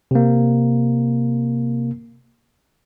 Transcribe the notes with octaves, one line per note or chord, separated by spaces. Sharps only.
C3 A#3